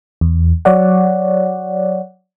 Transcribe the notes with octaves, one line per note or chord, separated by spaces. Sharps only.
E2
F#3 C#5 D5 F#5